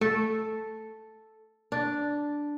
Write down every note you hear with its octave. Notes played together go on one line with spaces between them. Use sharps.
A3 A4
D4